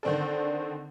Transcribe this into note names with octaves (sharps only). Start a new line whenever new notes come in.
D3 D#3 C4 D4 A4